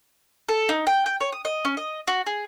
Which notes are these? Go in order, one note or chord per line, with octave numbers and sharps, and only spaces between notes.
A4
D#4
G5
G5
C#5
D#6
D#5
C#4
D#5
F#4
G#4